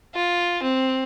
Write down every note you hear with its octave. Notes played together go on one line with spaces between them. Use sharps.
F4
C4